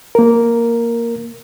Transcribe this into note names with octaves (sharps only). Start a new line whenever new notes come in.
A#3 A#4